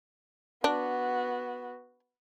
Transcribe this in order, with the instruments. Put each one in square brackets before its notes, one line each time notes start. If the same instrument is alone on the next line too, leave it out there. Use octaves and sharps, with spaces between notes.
[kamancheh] B3 F#4 [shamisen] D4